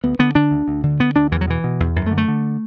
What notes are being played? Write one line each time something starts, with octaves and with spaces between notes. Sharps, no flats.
D2 B3
D3 B3
D3 D4
D2
D2
D3
D3 B3
D2 D4
E2 E3
F#3
B2 E3
B2
E2
F#2 E3
A3
D3
A3
D3